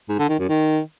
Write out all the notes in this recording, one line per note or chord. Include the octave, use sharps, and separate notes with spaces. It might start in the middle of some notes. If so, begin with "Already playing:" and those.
G#2
D3
D#3
F#2
D#3